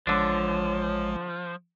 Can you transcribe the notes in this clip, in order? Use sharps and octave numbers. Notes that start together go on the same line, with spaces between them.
A1 D3 F3 G#3 D4 C#5